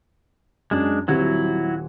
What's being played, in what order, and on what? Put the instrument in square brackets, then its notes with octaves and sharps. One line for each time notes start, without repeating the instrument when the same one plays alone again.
[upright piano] F#2 [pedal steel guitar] G#3 D4
[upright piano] D#1 G3 C4 [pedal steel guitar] F#3 E4 F#4